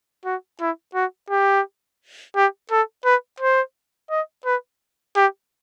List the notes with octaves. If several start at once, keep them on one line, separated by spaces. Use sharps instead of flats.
F#4
E4
F#4
G4
G4
A4
B4
C5
D#5
B4
G4